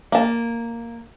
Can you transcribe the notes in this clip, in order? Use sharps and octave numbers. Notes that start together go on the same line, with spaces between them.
A#3 A5